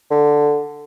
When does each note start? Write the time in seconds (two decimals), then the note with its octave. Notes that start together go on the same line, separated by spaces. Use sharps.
0.11 D3